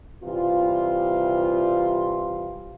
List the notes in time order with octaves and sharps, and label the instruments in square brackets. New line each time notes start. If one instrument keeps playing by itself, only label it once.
[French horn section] C3 E3 G3 F4